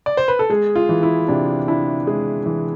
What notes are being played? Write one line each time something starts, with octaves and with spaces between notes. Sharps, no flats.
D5
C5
B4
A4
G#3 G#4
F4
E3
E4
C3 D4
D4 E4
G#3 G#4
E3